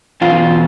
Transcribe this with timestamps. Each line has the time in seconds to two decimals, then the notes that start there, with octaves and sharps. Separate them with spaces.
0.21 E2 B2 F4